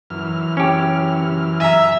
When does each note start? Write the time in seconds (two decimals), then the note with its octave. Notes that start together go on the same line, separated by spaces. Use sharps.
0.10 F#2 E3 F6
0.57 C#4 G4
1.60 E5 G#5 A#5